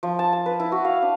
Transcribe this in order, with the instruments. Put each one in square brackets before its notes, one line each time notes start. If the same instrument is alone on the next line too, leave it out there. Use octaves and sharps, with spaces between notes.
[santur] F3
A5
A5
B4
E4
F#4
F5
D4